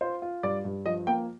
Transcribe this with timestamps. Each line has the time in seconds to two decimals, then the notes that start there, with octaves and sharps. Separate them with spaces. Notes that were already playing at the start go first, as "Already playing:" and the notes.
0.01 F4 C5
0.22 F4
0.43 G2 D5
0.65 G2
0.86 F3 D#5
1.07 A#3 G5